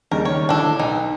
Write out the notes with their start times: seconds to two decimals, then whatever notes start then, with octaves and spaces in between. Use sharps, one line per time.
0.11 D#2 C#3 G3 A#4
0.25 C#5
0.49 A2 D3 G3 D4 A4
0.79 B1 D#4